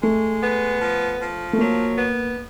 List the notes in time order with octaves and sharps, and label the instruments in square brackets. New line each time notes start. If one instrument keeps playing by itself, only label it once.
[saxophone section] G#3 [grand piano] A3
[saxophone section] B3
F3
F3
[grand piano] A3
[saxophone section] F#3 [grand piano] A#3
[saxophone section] B3